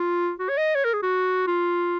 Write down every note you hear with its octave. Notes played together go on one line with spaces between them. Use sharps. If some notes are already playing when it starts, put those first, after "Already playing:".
Already playing: F4
F#4
C#5
D#5
C#5
A#4
G#4
F#4
F4